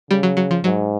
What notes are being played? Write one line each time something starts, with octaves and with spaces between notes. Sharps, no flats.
C#3 G3
F#3
F#3
F3
G#2 F#3